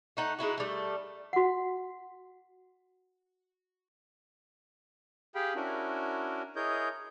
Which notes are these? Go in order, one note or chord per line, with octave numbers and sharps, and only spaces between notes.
A3 D#4 F#5
G#3 D#4 E4 F#4
G3 A3
F#4 F#5
G4 G#4 F5 G5 B5
C#4 D4 E4 F#4 A#4
E4 G#4 A#4 C#5 D#5 G6